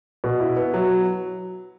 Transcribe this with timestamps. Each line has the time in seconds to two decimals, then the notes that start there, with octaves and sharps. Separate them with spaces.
0.24 B2
0.40 E4
0.56 B3
0.74 F#3